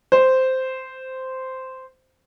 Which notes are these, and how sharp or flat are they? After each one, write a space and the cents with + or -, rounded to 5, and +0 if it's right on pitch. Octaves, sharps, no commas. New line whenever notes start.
C5 -10